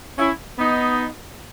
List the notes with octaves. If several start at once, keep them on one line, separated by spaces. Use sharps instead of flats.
C#4 E4
B3 D#4